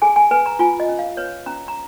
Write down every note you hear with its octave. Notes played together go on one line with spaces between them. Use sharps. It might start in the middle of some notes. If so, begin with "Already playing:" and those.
G#4 G#5
G#5
B4 G#5
A#5
F4 G#5
D#5
C#4
F5
B4 C#5
C#4 A#5
A#5